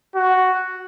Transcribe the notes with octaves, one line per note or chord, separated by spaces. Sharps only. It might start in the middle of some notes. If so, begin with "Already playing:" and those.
F#4